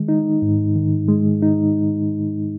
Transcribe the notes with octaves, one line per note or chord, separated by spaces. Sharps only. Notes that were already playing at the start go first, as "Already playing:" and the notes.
Already playing: D#3 G#3
D#4
G#2
D#3
G#3
D#4